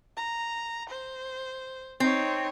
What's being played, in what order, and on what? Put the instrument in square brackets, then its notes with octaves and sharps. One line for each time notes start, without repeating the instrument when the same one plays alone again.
[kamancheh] A#5
C5
[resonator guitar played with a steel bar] C4 [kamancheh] D#4 C#5